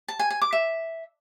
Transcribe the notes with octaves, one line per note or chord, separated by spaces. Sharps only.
A5
G#5
G#5
D6
E5